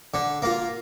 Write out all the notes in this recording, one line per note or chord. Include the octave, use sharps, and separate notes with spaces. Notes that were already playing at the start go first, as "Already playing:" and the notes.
D3
A#3 F4